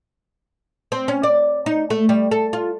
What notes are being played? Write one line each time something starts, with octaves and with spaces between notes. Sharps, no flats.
C4
C#4
D5
D#4
A3
G3
A4
F4